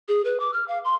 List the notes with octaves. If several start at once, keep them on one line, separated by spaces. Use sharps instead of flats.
G#4
B4
D6
F6
F5
C6